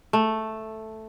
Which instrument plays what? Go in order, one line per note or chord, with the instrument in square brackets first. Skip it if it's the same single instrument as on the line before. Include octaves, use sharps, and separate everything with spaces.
[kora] A3